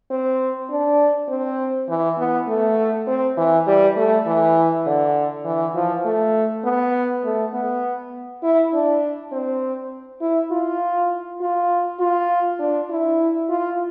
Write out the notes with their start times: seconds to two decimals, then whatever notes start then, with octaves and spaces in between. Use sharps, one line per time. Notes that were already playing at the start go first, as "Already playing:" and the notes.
0.10 C4
0.70 D4
1.29 C4
1.89 E3
2.18 B3
2.48 A3
3.07 C4
3.37 E3
3.67 G3
3.97 A3
4.27 E3
4.87 D3
5.45 E3
5.75 F3
6.05 A3
6.65 B3
7.24 A3
7.54 B3
8.43 E4
8.73 D4
9.32 C4
10.21 E4
10.51 F4
11.41 F4
11.99 F4
12.59 D4
12.90 E4
13.49 F4